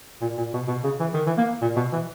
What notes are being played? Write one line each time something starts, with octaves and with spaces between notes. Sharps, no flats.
A#2
A#2
B2
B2
C#3
E3
D#3
E3
A#3
A#2
B2
E3